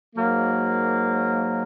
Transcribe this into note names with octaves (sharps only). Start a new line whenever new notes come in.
G#2 F#3 A#3